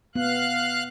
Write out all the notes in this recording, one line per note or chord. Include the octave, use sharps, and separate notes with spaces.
B3 F5 F#6